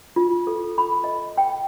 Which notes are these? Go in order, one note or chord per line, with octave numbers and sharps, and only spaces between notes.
F4
A4
B5
D#5
G5